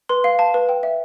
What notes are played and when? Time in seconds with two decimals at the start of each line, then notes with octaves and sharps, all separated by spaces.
0.09 B4 C6
0.24 F5
0.39 F5 A5
0.54 B4
0.69 G5
0.83 E5